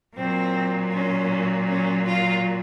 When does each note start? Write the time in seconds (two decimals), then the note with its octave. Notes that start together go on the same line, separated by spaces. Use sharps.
0.15 A#2 F#3 C4
0.91 C#4
1.66 C#4
2.05 F4